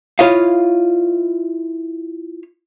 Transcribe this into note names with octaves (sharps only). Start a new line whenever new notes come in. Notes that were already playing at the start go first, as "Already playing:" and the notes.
E4 F4 C#5 D#5 F5